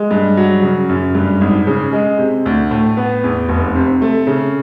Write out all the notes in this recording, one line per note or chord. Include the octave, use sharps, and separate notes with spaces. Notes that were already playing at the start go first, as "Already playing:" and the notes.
Already playing: G#3
G2
F#3
C#3
F#2
G2
G#1
C#3
G#3
C3
D2
A2
B3
E2
F1
C3
A3
C#3